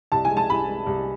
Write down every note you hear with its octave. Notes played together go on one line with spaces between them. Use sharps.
C2 A5
G#5
G#3
A5
C2 B5
G#3
C2